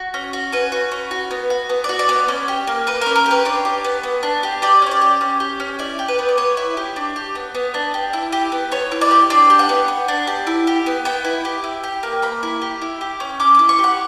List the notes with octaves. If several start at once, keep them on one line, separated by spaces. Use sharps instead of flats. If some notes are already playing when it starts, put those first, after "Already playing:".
Already playing: F#4
C#4
F#4
C#4 B4
F#4
C#4
F#4
B3
F#4
B3
F#4 D5
D5
B3
C#4
G4
A#3
A#3 B4
C#4 A#4
A#4
G4 B4
D4 C#5
G4
B3
B3
D4
G4
G4 D5
C#4 C#5
D5
G4
C#4
G4
C#4
E4 D5
G4
B4
B3
D5
B3 C#5
E4
G4
D4
G4
B3
B3
D4
G4
E4
G4
B3
B3 C#5
E4
D5
G4
D4 D5
G4
F#5
B3
B3
D4
G4
E4
G4
B3
B3 G5
E4
G4
E4
G4
A#3
A#3 B5
E4
G4
E4
G4
C#4
C#4 D6
E4 D6
C#6
G4 F#5